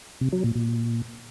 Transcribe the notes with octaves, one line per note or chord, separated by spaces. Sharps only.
C3
F#3
A#2
A#2